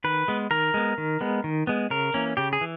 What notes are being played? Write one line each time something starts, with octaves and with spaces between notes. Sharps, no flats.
D#3 B4
G#3 B3
D#3 A#4
G#3 B3
D#3
G#3 B3
D#3
G#3 B3
C#3 A#4
E3 A#3 C#4
C#3 G4
G#4
E3